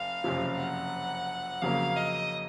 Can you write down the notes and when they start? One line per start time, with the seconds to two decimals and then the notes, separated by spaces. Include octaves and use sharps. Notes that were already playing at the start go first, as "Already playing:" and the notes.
Already playing: F#1 F5
0.24 F#1 F2 C3 F3
0.58 F#5
1.62 F2 C#3 F#3 A#3 F5
1.96 D#5